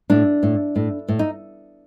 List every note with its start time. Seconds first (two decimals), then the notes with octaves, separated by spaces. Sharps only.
0.10 A2 D4
0.43 A2
0.76 A2
1.08 A2
1.19 D#4